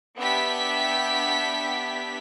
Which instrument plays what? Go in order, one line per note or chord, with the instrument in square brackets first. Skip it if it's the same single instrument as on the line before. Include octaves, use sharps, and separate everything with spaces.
[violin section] B3 D4 G4 E5 G5 B6